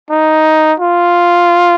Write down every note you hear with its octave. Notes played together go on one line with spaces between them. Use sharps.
D#4
F4